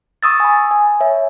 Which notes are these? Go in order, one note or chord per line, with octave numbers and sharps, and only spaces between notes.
C#6 D#6 E6 A6
G#5 B5
G#5
C#5 E5